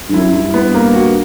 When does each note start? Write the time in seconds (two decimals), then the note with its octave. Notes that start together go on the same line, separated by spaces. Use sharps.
0.09 G2
0.13 F#2 E4
0.33 G2 E4
0.54 B3
0.74 A#3
0.94 F#4